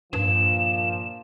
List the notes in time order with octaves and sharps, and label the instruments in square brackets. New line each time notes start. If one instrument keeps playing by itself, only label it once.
[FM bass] G2 [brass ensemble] A#2 F3 [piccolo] E7